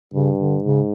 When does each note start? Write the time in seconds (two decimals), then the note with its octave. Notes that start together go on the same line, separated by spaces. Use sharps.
0.14 G2 C#3
0.39 D3
0.63 G#2 C#3